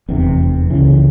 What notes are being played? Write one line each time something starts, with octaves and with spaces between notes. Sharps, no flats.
F1 E2 C3
C#2 C#3 E3